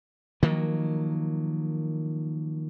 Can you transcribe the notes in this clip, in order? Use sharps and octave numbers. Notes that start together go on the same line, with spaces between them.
D#3 F3 F#3 A#3